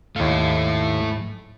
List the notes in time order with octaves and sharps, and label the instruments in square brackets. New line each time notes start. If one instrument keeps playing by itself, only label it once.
[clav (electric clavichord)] D#2 F5 [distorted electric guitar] G#2 [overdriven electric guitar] A3 E4